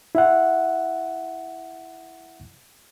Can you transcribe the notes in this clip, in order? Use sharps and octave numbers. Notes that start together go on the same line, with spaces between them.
E4 E5 F#5